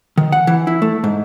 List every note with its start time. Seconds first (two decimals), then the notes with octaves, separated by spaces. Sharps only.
0.18 D#3
0.32 F#5
0.47 E3
0.67 E4
0.82 A3
1.04 G#2